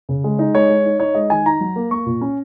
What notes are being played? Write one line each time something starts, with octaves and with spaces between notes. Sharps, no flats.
C#3
G#3
D#4
G#3 C#5
G#3
D#4
D#4 C#5
G#3 D#5
D#3 G#5
D#4 A#5
F#3
A#3
A#3 C#6
A#2
C#4